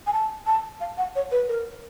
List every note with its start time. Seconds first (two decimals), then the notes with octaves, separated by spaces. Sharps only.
0.06 G#5
0.13 A5
0.46 A5
0.80 F5
0.97 F#5
1.15 C#5
1.31 B4
1.48 A#4